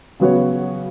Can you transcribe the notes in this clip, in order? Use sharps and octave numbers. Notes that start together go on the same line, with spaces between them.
C#3 F#3 B3 F#4 C#5